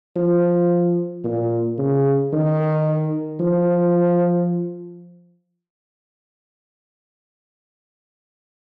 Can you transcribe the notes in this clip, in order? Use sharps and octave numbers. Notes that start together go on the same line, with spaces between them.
F3
A#2
C#3
D#3
F3